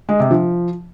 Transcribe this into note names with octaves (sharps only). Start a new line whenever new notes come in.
G#3
C3
F3